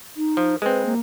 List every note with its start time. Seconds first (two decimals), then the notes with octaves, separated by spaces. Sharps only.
0.17 D#4
0.37 F3
0.62 G#3 C4 B4
0.86 A#3